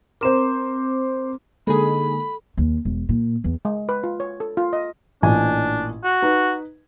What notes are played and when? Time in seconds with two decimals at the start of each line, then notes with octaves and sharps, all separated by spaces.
0.21 C4 A#4 C5 D6
1.67 D3 G#3 A#3 D#4 G#4 A4 B5
2.58 D#2
2.85 E1
3.09 A#2
3.44 E2
3.65 G#3
3.89 B4
4.04 F4
4.20 C#5
4.40 A4
4.57 F4
4.73 D#5
5.22 A1 A#2 D4 G#5
6.04 F#4
6.22 D#4 B4